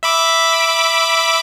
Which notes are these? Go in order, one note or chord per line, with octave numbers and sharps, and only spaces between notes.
E5 B5 D6